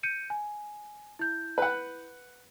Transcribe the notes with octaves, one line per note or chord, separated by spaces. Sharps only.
G6 C#7 D#7
G#5
E4 G6
B4 F#5